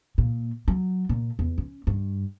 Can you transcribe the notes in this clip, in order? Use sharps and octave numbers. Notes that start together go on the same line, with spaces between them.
A#2
F#3
A#2
E2
C#4
G2